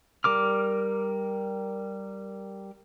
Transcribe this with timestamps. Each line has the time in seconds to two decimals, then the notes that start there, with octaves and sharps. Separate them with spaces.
0.24 G3 A#4 D6 F6